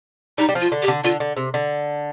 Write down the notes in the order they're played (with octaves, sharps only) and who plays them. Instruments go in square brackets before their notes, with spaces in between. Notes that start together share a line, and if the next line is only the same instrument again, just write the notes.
[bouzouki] G3 [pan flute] D#4
[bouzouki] G3
F3
[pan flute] F4
[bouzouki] D3
[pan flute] G4
[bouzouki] D3
[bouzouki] D3 [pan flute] F4
[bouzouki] D3
C3
D3